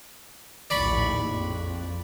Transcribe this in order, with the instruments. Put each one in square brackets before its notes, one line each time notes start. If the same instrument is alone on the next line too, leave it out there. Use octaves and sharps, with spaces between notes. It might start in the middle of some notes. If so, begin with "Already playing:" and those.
[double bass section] A#1 D#2 A2 [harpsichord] D5 B5 C#6
[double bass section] F2